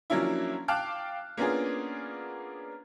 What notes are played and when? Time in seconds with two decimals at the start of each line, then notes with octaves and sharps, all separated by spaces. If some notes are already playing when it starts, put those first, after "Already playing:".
0.10 F3 F#3 A#3 C#4 D4 E4
0.68 F5 G5 A5 D6 F6 F#6
1.37 A#3 B3 C#4 D4 F4 G#4